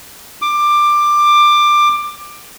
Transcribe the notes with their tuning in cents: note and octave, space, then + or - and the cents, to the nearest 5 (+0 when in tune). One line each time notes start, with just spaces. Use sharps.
D6 +15